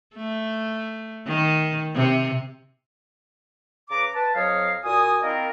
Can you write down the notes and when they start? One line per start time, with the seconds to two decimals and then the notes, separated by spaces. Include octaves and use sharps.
0.15 A3
1.26 D#3
1.94 C3
3.91 C#3 B4 A#5 D6
4.15 B4 A5
4.35 F2 F#3 C#5 D#5 F5
4.84 A#2 F#4 G#5 D#6
5.23 A#3 C4 E4 F4 A#4 D#5